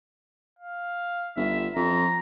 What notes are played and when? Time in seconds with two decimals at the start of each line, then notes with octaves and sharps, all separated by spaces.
0.59 F5
1.37 G1 E5
1.76 F2 A#5